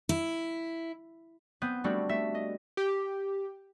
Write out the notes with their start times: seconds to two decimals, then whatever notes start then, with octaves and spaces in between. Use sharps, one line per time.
0.09 E4
1.62 B3 C4 G6
1.84 G3 A3 C4 D4 F#4 G4
2.09 A3 E5
2.35 D#5
2.77 G4